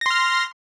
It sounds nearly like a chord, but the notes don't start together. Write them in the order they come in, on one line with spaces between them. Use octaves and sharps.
A#6 C6 F6